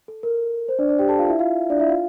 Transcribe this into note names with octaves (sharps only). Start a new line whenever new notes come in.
A4
A#4
C5
D4 D5
D4 D5
G4 G5
A4 A5
F4 F5
E4 E5
F4 F5
D4 D5
E4 E5
F4 F5